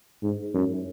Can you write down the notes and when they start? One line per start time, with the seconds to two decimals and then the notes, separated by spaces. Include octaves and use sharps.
0.23 G#2
0.54 F#2